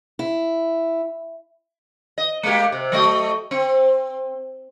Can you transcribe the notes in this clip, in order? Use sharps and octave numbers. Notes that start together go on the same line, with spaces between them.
E4
D#5
G#3 A#3 G4
C3
F#3 A3 D#5
C4